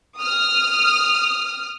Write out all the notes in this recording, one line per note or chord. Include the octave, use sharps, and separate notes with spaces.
D#6 F6